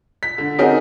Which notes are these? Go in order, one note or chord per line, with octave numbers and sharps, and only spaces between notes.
B6
D3
C4 C#4 D#4 F#4 G#4 A#4